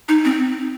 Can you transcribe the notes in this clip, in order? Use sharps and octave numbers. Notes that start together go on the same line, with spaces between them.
D#4
C4